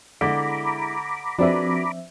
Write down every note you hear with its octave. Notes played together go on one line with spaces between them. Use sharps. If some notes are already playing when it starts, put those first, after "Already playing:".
D3 G#3 B3 E4 A#5 B5 D6
F3 C4 D4 F#4 G#4 B4 E5